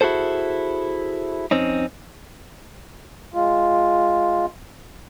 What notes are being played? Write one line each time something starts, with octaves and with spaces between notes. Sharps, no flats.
E4 F#4 G#4 A4 C5
F2 C4 C#4 D#4
G#3 F4